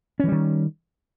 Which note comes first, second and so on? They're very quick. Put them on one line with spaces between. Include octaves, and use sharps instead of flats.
C#4 E3 G3 D#3